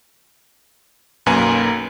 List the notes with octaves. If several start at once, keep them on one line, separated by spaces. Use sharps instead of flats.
B1 F#2 A#3 B4 G#5 A#5